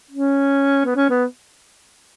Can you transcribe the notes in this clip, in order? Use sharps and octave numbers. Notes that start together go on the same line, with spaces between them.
C#4
B3
C#4
B3